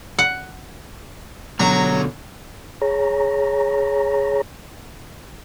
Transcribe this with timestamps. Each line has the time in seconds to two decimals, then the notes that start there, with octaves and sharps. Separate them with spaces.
0.19 F#5
1.60 B2 D3 F#3 A#5
2.82 G#4 C#5 A#5